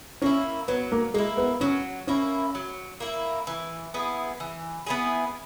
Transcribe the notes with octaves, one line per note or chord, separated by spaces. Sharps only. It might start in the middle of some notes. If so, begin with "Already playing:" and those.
A#3 C#4 E4
F#3 B3
A#3
G#3 A#3 E4
B3
F#3 C#4
A#3 C#4 E4
F#3
A#3 E4
E3
B3 E4 G#4
E3
B3 E4 G#4